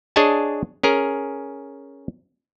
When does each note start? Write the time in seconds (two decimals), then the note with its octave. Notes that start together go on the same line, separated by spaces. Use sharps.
0.16 D4 G#4 C#5 D#5 G#5 A5
0.83 C#4 G#4 A#4